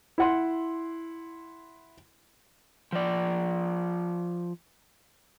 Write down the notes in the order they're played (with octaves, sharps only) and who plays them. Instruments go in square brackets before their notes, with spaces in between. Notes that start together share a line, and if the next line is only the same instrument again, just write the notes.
[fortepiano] E4 F#5 C6
[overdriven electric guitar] F3 D5